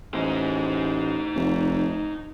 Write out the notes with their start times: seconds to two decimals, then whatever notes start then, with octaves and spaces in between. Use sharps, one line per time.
0.14 A1 D#4 C5
1.35 F1